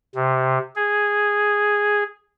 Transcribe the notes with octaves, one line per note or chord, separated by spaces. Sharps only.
C3
G#4